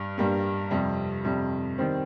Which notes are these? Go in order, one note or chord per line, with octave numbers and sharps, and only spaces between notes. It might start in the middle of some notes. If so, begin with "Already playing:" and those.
Already playing: G2 G3
G2 G3 A#3
F2 C3 G3
F2 C3 G3
D#3 G3 C4